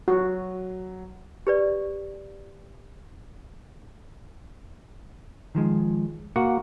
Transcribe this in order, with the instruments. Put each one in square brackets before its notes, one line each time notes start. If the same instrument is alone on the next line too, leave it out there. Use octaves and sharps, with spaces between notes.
[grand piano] F#3 [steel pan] F#4
[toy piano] G4 B4 D5
[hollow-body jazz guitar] D#3 F3 G#3
[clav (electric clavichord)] A#3 F#4 [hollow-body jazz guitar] F#5